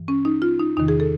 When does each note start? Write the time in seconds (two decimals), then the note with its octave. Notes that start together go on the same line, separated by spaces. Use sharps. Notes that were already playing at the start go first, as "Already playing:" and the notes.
Already playing: G2 E3
0.08 C#4
0.25 D#4
0.42 F4
0.59 D#4
0.77 E2 C3 D#3 D#4
0.88 G#4
1.00 A4